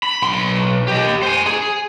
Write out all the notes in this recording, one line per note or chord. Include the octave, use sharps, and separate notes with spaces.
B5
B1 C6
G4 D#5
C5 G#5
G#4